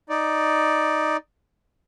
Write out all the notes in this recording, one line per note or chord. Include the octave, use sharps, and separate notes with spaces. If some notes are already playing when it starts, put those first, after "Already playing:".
D#4 D5